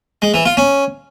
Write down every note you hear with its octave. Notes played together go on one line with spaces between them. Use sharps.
G#3
E3
F4
C#4